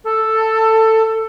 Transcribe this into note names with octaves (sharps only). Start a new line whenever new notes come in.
A4